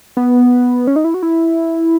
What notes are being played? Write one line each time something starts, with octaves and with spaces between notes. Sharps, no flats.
B3
C#4
D#4
E4
F#4
E4